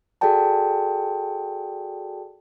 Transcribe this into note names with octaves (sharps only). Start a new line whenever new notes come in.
F#4 G#4 A4 D5 G5 A5